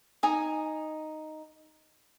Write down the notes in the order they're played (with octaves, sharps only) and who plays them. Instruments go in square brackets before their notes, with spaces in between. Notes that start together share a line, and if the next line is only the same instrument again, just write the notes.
[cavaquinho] D#4 G#5 D#6